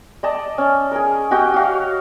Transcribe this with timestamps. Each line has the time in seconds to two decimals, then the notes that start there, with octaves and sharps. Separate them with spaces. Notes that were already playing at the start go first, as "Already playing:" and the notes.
0.23 D5 D#5 A5
0.58 C#4
0.91 G#4 A#4
1.31 F#4 G4 D#5 G5
1.54 F#4 F5